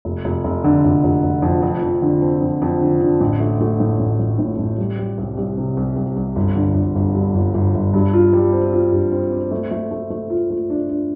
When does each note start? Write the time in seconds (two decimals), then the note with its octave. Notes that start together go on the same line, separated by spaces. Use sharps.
0.05 F1
0.25 F1
0.44 F1
0.64 D3
0.84 F1
1.04 F1
1.23 F1
1.42 F2
1.63 F2
1.82 F2
2.02 D3
2.22 C4
2.41 F2
2.62 F2
2.81 D3
3.01 D3
3.20 A1
3.40 A3
3.61 A3
3.80 A2
4.00 A1
4.19 A1
4.39 A2
4.59 A1
4.78 G3
4.98 G3
5.18 C2
5.37 C2
5.58 C3
5.77 C2
5.96 C2
6.16 C2
6.36 G1
6.56 D3
6.75 G1
6.95 G1
7.15 G2
7.35 G1
7.54 G1
7.75 G1
7.94 G2
8.14 F4
8.33 G3
8.53 C4
8.73 F4
8.92 G2
9.12 C4
9.32 C4
9.51 A3
9.71 A3
9.91 A3
10.10 A3
10.30 F4
10.50 A3
10.70 D4
10.90 D4